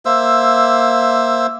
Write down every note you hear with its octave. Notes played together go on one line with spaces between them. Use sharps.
A#3 C5 E5 E6